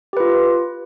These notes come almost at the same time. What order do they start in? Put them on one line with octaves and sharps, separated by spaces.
G4 B4 F4